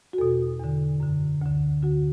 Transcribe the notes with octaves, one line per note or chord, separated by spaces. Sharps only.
F#4
E2 B2 A4
E2 D3
F#2 D3
D2 D3
D2 D3 F#4